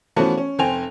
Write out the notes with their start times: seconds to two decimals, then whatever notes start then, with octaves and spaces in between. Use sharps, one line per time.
0.16 E3 F3 A3 B3 C#4 F#4
0.38 C#4
0.59 F1 C4 G5 G#5 F7